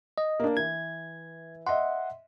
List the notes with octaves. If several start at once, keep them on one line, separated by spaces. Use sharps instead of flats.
D#5
A#3 D4
E3 G#6
D#5 E5 F#5 C6